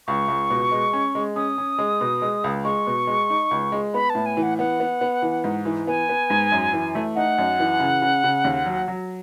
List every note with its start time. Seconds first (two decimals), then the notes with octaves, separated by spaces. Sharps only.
0.07 C#2 C#6
0.28 C#2
0.50 B2
0.71 G#3
0.93 C#4
1.15 G#3
1.36 C#4 D#6
1.58 C#4
1.79 G#3
2.01 B2
2.22 G#3
2.44 C#2
2.64 G#3 C#6
2.87 B2
3.07 G#3
3.30 D#4
3.51 C#2
3.72 G#3
3.94 B3 B5
4.10 A2 A5
4.26 G#5
4.37 E3
4.43 F#5
4.58 B3 F#5
4.80 B3
5.01 B3
5.22 E3
5.44 G#2
5.65 E3
5.87 B3 G#5
6.09 B3
6.30 G#2
6.52 F#2
6.73 E3
6.95 A3
7.15 D#4 F#5
7.38 F#2
7.59 E3
7.80 C#3
8.02 C#3
8.24 C#3
8.45 D#2
8.66 F#3
8.88 F#3